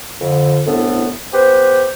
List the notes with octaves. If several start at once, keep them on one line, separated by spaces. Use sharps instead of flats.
F2 D3
C2 A2 B3 D4 A4
B3 G4 B4 C5